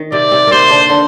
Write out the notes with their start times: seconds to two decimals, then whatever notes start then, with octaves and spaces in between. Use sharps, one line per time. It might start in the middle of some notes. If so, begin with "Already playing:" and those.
Already playing: D#3
0.12 C3 C4 D5
0.32 C3 C4
0.47 C3 A#3 C4 C5
0.70 D3 D4
0.90 D3 D4